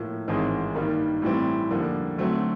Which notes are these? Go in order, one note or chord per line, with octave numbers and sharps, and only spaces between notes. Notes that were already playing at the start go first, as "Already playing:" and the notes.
Already playing: A2 F3 A#3
A1 G#2 D#3 G#3 C4
G2 D#3 G3 A#3
A2 E3 G3 C4
F2 D3 G3 A#3
D3 F#3 A3 C4